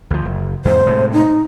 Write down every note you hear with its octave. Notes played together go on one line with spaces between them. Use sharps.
D2 F3
F#1
E2 G#2 C3 C5
A2 C3 G#3
D#4